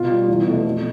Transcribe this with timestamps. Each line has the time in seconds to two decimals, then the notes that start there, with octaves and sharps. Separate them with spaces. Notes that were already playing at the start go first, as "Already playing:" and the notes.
Already playing: B2 F4
0.09 G3
0.28 E2
0.47 B2 A3
0.65 F2